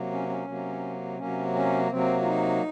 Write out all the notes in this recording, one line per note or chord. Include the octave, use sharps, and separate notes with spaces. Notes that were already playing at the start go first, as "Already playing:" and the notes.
Already playing: C3 F#3 A#3
C#4
C#4
C3 F#3 A#3
C3 F#3 A#3 C#4
C#4
C3 F#3 A#3 C4
F4
D#4